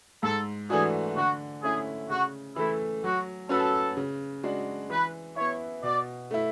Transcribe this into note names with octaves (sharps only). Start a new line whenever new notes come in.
G#2 A4
E3 A3 D4 F#4 G#4
D3 F#4
A3 C#4 E4 G#4
C#3 F#4
E3 A3 E4
F#3 F#4
C#4 F#4 A4 B4
C#3
G#3 D4 F#4
E3 B4
B3 E4 C#5
B2 D5
A3 E4